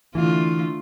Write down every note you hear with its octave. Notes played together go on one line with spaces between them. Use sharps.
D3 E3 A3 F4